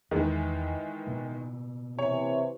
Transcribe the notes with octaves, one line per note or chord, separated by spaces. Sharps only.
E2 D#3 E3 G#3
B2 A#3 B3
C3 E3 C#5